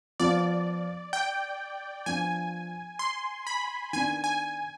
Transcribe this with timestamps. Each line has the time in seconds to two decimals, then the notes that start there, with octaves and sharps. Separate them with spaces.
0.20 F3 B3 F4 D5
1.13 G5
2.06 F3 B3 D4 F4 G#5
2.99 C6
3.47 B5
3.93 D#3 B3 D4 G#5
4.24 G#5